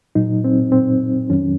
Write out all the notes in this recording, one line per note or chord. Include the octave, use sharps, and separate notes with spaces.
A#2 F#3 D#4
C4
C4
F2 D#3 F#3 C#4